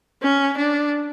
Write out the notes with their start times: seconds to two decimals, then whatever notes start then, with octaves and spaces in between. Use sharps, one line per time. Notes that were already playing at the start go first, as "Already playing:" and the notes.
0.23 C#4
0.57 D4